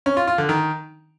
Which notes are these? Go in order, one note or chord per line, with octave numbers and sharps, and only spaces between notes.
C#4
F4
F4
D3
D#3